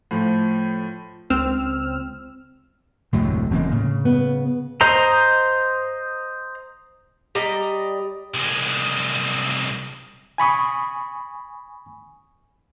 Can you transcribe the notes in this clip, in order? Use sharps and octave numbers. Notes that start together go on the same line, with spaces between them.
A2 F3
C#2 C4 E6 F6
F1 D2 A2 C3 F#3 G#3
E1 D3 E3 A#3 C4 C#4
A2 C#3
B3
C5 D#5 A#5
G3 D5 D#5 A#5
C2 G#3
G#5 B5 C#6 D#6